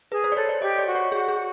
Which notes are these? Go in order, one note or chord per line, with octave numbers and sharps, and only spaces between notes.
G#4 B4
C5
D5
A4 C#5
D5
G4 D#5
D5
F#4
C#5
F#4 G#4
G#4